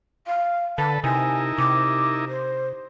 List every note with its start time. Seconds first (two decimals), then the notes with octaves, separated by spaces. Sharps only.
0.27 F5
0.78 D3 A4 B4 A5
1.04 C3 D#4 E4 A#4 G#5
1.58 C3 D6
2.28 C5